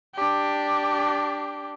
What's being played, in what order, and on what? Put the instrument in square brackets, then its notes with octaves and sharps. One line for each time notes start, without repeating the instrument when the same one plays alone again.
[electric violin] D4 G4